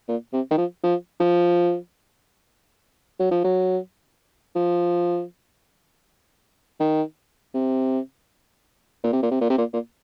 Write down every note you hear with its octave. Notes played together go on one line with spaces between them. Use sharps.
A#2
C3
D#3
F3
F3
F3
F#3
F3
F#3
F3
D#3
C3
A#2
C3
A#2
C3
A#2
C3
A#2
A#2